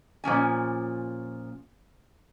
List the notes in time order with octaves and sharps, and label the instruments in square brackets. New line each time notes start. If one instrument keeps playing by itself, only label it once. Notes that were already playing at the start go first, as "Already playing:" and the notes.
[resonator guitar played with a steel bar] A#2 F3 C#4 G#5